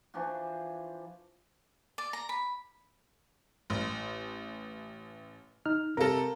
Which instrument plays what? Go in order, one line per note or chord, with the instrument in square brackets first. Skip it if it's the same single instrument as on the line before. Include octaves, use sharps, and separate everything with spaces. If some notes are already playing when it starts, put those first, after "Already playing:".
[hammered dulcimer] E3 F3 D4 F#4
[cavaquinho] D5
A#5
B5
[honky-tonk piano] A1
[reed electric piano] D#4 F6
[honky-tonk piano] C3 A4 [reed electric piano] A#4 F5 A#5